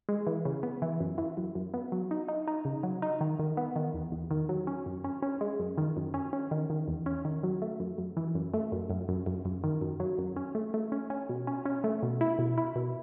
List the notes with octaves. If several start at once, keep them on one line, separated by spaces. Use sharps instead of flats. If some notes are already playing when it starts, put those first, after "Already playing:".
G#3
E3
C#3
B3
E3
F#2
E3
F#2
F#2
B3
F#3
D#4
D#4
D#4
C#3
F#3
D#4
D#3
D#3
B3
D#3
E2
E2
D#3
F#3
C#4
F#2
C#4
C#4
G#3
F#2
D#3
F#2
C#4
C#4
D#3
D#3
E2
C#4
D#3
F#3
A3
F#2
F#2
E3
F#2
A3
F#2
F#2
F#2
F#2
F#2
D#3
F#2
F#3
F#2
C#4
A3
A3
C#4
C#4
B2
C#4
C#4
A3
B2
E4
B2
E4
B2